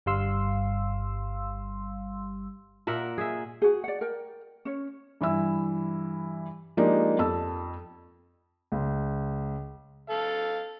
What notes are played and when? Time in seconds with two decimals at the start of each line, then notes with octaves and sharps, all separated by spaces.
0.06 G1 G2 G3 F5 C6 E6
2.87 A#2 A#4 E5 F#5
3.18 G#4 E5
3.62 F#4 G#4
3.84 D5 F#5
4.01 A#4 G5
4.65 C#4 C#5
5.21 G2 E3 E4 E6
6.77 F3 G#3 A#3 D4 D#4 G4
7.19 F2 A5 E6
8.72 C#2
10.10 A4 F5